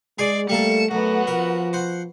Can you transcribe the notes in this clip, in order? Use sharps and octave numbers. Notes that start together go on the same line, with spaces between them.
G#3 G#4 D5 G#5 C6
G3 A3 A#3 A4 C#7 E7
F#2 A3 B3 F#4
F3 A#4
C5 F#5